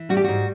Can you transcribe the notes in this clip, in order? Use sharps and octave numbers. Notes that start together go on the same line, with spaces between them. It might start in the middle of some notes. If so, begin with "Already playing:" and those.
Already playing: E3
G3 F#4
G4
G#2 F#4